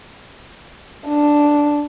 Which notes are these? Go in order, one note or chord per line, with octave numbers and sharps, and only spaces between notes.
D4